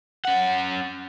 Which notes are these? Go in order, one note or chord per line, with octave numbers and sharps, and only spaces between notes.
C#4 F#5